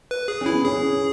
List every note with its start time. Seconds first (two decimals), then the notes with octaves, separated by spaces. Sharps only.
0.11 B4
0.28 G#4
0.41 C#4 E4
0.53 B3
0.64 C#4 G#4